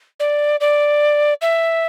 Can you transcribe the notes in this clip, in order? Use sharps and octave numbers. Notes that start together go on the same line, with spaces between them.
D5
D5
E5